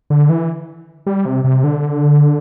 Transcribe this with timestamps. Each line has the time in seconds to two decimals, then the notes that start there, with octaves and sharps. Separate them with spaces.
0.10 D3
0.29 E3
1.06 G3
1.25 C3
1.44 C3
1.64 D3